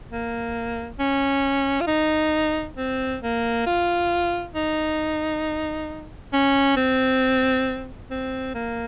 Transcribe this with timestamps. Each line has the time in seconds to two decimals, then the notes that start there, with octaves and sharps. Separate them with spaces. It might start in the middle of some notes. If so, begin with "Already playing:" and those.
0.11 A#3
1.00 C#4
1.81 F4
1.87 D#4
2.77 C4
3.22 A#3
3.66 F4
4.55 D#4
6.33 C#4
6.77 C4
8.11 C4
8.55 A#3